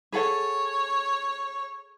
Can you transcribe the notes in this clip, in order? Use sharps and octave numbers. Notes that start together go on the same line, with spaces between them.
G#4 A4 C#5 F#5